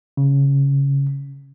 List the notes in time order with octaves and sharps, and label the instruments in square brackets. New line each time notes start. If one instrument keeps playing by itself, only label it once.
[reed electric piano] C#3